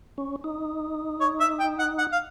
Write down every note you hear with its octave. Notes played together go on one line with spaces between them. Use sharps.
C#4
D#4
C#5
E5
G5
F#5
F#5
F5